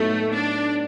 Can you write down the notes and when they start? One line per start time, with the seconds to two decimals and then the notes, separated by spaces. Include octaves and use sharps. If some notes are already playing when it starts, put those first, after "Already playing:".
Already playing: A2 F#3 A3 B3 D#4
0.31 D4